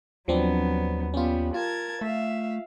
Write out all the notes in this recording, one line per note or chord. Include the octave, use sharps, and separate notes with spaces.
D#2 F3 F#3 B3 C4 D4
G3 B3 C#4 F4
F4 A#4 A5 G#6
A3 E5 F5